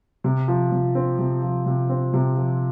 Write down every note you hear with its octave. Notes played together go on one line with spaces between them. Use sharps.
C3
F3
C3
C4
C3
F3
C3
C4
C3
F3